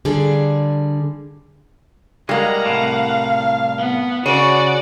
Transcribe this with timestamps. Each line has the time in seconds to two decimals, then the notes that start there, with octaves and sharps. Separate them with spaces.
0.05 D3 G3 G#4 F5
2.29 G3 G#3 A#3 F5 F#5 A#5
2.66 C2 A2
3.78 B3
4.26 C#3 F#4 C#5 D5